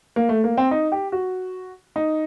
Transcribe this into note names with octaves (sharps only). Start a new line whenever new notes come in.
A#3
A3
A#3
C4
D#4
G4
F#4
D#4